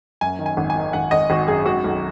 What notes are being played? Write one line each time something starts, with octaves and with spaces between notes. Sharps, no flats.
F#2 G#5
D#3
G#5
G#1
G#5
D#3
G#1 F#5
G#1 D#5
G#1 F#4
F#2 G#4
G#3 F#4
B1